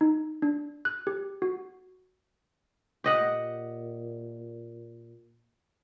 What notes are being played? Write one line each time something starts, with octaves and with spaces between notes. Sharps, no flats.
D#4
D4
F#6
G4
F#4
A#2 G4 D#5 F#5